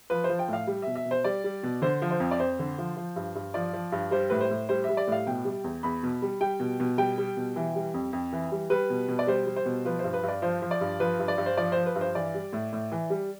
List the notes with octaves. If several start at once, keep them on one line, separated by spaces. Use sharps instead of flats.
F3 B4
C5
F3
G5
A2 F5
G3
E5
B2
E5
B2
C5
G3 D5
G3
B2
D3 C5
F3
C5
F2
D5
F2 C5
D3
F3
F3
G2
G2
F3 D5
F3
G2
G3 C5
A2 B4
C5
A2
G3 C5
G3 E5
D5
A2 F5
B2 G5
G3
E2
E2 B5
B2
G3
G3 G5
B2
B2
G3 G5
G3
B2
E3
G3
F2
F2
E3
G3
G3 B4
B2
B2
D5
G3 C5
G3
C5
B2
F3 B4
G2 C5
B4
G2
D5
F3 C5
F3
D5
G2
F3 B4
G2
D5
G2
C5
F3 D5
F3 C5
B4
G2
C5
E3 D5
G3
A2
A2
E3
G3